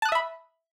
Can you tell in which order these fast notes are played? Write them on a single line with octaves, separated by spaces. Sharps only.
A5 F#6 D#6 E5 B5